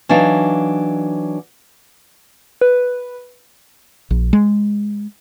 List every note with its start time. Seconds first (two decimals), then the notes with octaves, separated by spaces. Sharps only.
0.09 E3 F#3 D4 D#4 F5
2.61 B4
4.11 A#1
4.33 G#3